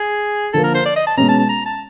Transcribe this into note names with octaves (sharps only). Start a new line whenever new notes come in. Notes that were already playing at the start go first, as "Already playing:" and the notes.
Already playing: G#4
D3 F3 A#3 A4
A#4
C5
D5
D#5
A5
B2 G#3 C#4 A#5
A5
A5
A#5
A5